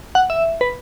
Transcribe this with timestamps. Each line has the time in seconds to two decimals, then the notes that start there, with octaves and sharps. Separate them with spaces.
0.15 F#5
0.30 E5
0.61 B4